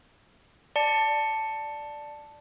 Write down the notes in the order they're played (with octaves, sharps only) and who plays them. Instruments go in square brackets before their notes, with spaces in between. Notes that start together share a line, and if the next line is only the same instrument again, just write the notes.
[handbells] D5 A5 C#7